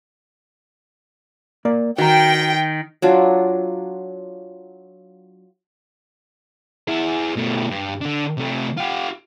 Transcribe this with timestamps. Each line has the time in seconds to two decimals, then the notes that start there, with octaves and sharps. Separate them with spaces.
1.65 A#3 A#4 D5
1.98 D#3 F#4 G5 A#5
3.02 F#3 D4 F4
6.88 E4 G#4
7.36 B2 A3
7.70 G2
8.01 D3 D4
8.37 C3 A3
8.77 F4 G4